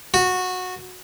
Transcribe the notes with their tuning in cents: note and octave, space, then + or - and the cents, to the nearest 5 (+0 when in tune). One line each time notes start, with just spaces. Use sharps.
F#4 -15